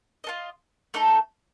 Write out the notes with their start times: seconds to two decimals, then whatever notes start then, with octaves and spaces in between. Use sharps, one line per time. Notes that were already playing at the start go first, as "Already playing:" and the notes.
0.24 F4 A4 D#5
0.94 A3 D#4 A4